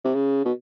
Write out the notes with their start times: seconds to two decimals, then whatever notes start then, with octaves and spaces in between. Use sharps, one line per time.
0.05 C3
0.15 C#3
0.45 B2